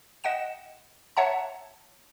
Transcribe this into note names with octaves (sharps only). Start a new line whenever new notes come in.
D#5 F#5 G5 E7
C#5 E5 F#5 A5 A#5